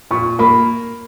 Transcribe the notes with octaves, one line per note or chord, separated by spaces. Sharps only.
A#2 C#6
A#3 B5